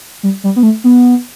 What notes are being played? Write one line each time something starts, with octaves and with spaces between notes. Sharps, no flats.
G3
G3
B3
A3
B3